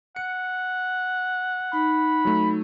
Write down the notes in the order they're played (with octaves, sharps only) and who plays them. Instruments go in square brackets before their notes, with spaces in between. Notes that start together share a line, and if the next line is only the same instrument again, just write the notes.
[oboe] F#5 [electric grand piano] C#7
[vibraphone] D#4 [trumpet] B5
[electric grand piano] F#3 A3